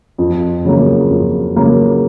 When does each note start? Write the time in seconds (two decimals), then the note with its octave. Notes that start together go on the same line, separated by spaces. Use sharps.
0.18 F2
0.65 C#3 F#3 A#3
1.09 F2
1.56 C#3 F#3 A#3